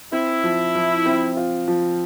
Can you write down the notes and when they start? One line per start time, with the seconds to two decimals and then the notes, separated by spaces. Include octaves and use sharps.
0.12 C4 E4
0.43 F3
0.75 F3
1.06 C4
1.37 F4
1.68 F3